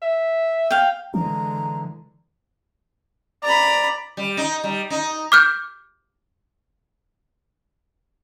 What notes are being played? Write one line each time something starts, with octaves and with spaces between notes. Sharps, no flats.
E5
F5 G5
D3 E3 G#3 A#5
D5 A#5 B5
G3
D#4
G3
D#4
D6 F6 G6